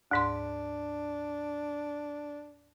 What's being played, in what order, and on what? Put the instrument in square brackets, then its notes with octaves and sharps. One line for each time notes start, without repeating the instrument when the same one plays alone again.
[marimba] D2 G#2 C6 [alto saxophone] D4